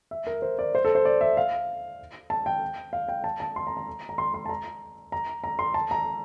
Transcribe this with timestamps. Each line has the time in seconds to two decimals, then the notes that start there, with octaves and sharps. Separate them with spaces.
0.11 E5
0.27 A#4
0.42 C5
0.59 D5
0.75 C5
0.85 A4
0.95 C5
1.05 D5
1.21 E5
1.37 F5
2.30 A5
2.46 G5
2.93 F5
3.09 G5
3.24 A5
3.40 A5
3.56 C6
3.67 A#5
3.77 A#5
4.09 A#5
4.18 C6
4.34 C6
4.46 A5
4.49 A#5
5.12 A#5
5.44 A#5
5.59 C6
5.74 A5
5.91 A#5